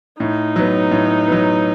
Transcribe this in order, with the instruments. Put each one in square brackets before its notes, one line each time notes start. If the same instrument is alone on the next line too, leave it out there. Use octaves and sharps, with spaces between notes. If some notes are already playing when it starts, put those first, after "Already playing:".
[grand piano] A2 [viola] D#4
[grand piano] F#3 B3
A2
F#3 B3